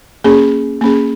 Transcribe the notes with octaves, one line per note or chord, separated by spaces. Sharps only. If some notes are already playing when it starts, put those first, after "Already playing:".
A#3 C#4 G#4
A#3 C#4 G#4